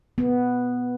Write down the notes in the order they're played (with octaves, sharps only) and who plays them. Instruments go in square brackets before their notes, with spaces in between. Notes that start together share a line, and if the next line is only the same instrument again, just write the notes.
[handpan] B3